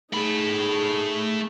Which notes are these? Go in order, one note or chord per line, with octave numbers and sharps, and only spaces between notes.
A3 D#4 G#4 B5